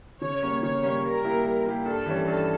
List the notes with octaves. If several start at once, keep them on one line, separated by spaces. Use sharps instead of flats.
C#3 C#5
G3 A#3 C#4
C#3 C#5
G3 A#3 C#4
G3 A#4
A#3 E4 G4
G3
A#3 E4 G4
G2 A4
E3 G3 C#4
G2 A4